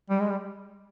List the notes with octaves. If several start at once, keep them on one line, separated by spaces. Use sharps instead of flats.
G3
G#3
G3